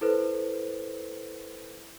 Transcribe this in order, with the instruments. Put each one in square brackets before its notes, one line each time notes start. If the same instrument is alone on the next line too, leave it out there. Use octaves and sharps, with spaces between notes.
[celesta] E4 A4 B4 C5